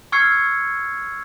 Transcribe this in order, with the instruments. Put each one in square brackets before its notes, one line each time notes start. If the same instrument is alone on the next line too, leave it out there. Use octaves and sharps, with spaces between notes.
[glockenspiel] C#6 E6 F6 G#6 C7 C#7